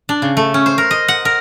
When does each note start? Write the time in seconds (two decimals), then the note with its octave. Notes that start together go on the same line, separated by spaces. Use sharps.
0.09 D4
0.22 C#3
0.37 A3
0.54 C#4
0.66 C5
0.78 A#4
0.91 D#5
1.08 F#5
1.25 A#4